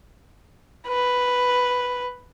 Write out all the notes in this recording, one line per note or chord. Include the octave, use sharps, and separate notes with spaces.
B4